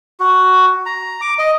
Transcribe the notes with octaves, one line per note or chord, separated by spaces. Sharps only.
F#4
A#5
D6
D#5